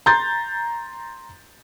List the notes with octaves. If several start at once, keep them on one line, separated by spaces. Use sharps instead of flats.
A#5 C6 G6 A6